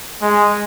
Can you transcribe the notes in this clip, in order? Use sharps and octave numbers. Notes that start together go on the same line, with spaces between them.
G#3